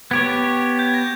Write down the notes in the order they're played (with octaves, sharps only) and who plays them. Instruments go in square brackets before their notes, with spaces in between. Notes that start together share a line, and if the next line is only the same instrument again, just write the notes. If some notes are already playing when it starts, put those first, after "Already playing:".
[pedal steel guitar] B3 G4 C#5 [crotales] G#6
[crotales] G6
G#6
A#6